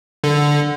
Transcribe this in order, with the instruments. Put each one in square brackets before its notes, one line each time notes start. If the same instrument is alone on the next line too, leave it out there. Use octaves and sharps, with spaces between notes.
[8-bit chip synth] D3